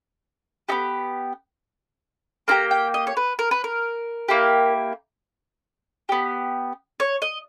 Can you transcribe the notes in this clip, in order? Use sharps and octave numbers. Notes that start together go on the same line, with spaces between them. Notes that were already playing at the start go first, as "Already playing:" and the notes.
B3 D#4 G4
A#3 E4 G4 A#5
G5
D#5
C#5
B4
A#4
B4
A#4
A#3 E4 G4
B3 G4
C#5
D#5